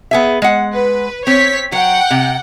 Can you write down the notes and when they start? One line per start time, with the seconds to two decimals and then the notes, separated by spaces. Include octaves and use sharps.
0.11 B3 G#4 E5
0.42 G#3 F#5
0.75 B4
1.27 C4 C#5 B6
1.72 F#3 F#5 G5
2.11 C3